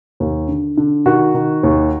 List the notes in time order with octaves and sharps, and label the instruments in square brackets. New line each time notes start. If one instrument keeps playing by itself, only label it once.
[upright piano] D#2
D3
D3
D#3 F#4
D#3
D#2